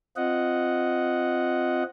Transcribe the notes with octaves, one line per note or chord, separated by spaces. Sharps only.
C4 F4 D#5 F#5